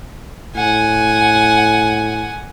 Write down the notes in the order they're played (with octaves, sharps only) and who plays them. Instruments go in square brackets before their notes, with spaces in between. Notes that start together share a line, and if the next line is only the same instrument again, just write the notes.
[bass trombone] A2 [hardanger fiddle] F#5 G#5